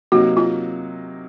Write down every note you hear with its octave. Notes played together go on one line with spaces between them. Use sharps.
C3 F#3 A#3 D#4 F#4
F4